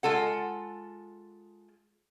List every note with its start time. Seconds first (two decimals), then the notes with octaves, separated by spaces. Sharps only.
0.03 G#3 F4 A4 F#5